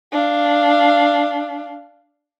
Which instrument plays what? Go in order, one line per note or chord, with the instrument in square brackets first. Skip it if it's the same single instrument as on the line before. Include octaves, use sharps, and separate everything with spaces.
[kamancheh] D4 F5